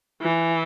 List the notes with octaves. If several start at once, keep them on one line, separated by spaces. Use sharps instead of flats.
E3